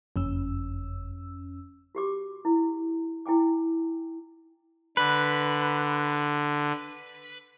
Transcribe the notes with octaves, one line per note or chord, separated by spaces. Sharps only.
F#1 F2 C#4 E6
F#4 G4 D6
E4
E4 G5 G#5 D6
D3 B4